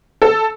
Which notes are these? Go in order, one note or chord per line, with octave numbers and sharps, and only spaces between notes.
A4